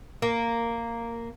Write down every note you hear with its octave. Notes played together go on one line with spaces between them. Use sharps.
A#3